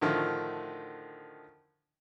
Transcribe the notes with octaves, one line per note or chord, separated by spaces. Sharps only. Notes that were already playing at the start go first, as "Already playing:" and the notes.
A2 D3 D#3 F3 A3